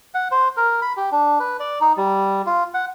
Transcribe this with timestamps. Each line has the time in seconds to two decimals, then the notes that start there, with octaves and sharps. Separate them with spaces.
0.14 F#5
0.31 C5
0.57 A#4
0.82 B5
0.97 G4
1.12 D4
1.40 B4
1.60 D5
1.81 D#4
1.97 G3
2.46 F4
2.74 F#5